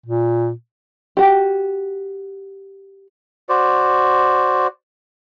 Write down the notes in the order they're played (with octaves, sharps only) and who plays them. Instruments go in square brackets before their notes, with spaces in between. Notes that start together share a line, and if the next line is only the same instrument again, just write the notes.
[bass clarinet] A#2
[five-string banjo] F#4 G4
[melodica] F#4 C5 D5